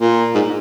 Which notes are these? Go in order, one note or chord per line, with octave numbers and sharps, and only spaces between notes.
A#2
G#2